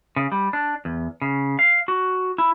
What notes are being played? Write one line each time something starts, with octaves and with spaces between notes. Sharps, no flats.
C#3
G3
D4
E2
C#3
F5
F#4
E4